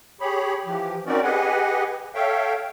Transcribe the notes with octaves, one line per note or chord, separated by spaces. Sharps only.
G4 G#4 C#5 B5
E3 F3 G4
C4 C#4 D#4 F#4 A#4 D5
G4 G#4 B4 D#5 F#5 G#5
A4 C#5 E5 F5 G5